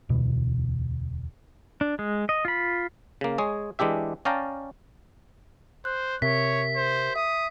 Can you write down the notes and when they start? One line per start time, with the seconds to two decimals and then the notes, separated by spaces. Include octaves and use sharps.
0.09 E1 D2 B2 E3
1.81 D4
1.99 G#3
2.29 D#5
2.45 F4 B5
3.21 C#3 A#3
3.38 G#3 G#4 C#5
3.79 E3 G#3 D4 G4 E5
4.25 C#4 D5 F5 G5 A5 A#5
5.85 C5 F#6
6.22 C3 G4 A#4 C#5 E5 B6
6.76 C5
7.16 E5 D#6